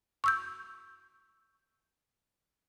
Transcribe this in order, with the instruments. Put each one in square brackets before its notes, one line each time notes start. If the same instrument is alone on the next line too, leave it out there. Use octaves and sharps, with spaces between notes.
[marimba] C#6 E6 G6